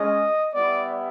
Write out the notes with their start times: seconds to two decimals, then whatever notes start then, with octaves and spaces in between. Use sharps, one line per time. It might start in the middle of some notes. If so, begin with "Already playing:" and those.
Already playing: G#3 C#4 D#5
0.54 G3 B3 E4 D5